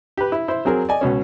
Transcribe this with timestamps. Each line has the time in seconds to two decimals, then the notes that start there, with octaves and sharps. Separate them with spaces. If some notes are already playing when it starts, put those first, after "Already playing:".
0.17 G4 B4
0.32 E4
0.48 E4 C5
0.65 F#3 C4 G#4 A#4
0.89 D5 D#5 G#5
1.01 C#2 B2 C#4